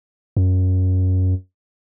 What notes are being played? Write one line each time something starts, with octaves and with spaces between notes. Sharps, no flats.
F#2